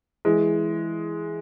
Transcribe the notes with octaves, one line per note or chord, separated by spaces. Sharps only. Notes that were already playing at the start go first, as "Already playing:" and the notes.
E3 G#3